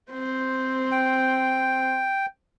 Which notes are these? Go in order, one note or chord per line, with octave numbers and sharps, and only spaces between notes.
C4 C5
G5